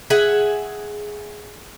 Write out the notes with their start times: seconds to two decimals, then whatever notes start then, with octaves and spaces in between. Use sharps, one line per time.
0.10 G#4 E5 F#5 G#5